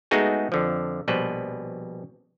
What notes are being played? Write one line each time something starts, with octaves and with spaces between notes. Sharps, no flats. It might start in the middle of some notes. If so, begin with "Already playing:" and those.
G#3 A3 B3 D#4 F#4 G#4
F2 D3 F3
A#1 B2 G3 B4 C5